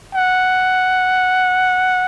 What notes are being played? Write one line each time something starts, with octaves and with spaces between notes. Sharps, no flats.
F#5